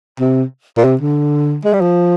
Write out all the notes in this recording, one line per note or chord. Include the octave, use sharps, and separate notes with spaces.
C3
A#2
C3
D3
G#3
G3
F3